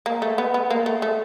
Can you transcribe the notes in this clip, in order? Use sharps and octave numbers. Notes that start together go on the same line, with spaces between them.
A#3
A3
B3
B3
A#3
A3
A3